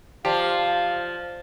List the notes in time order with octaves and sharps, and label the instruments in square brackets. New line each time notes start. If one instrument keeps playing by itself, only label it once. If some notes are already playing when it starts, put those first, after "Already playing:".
[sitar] F3 [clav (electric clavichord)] G4 [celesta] C5 D5 A5 [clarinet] F5